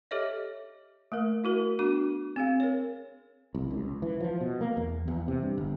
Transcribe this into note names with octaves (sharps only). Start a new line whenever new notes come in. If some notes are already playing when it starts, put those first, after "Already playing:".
G4 A4 C#5 D#5 E5
A3 A#3 A#4
E4 F#4 A#4
B3 D4 F#4 D6
C4 G#4 F5
A#4 C#5
C2
C#2
E3
F3
B2
A#3
E2
E2
C3
G2
G1